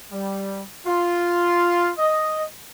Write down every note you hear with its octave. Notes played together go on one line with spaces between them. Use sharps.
G3
F4
D#5